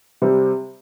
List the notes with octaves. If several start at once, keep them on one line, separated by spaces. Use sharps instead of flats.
C3 G3 C4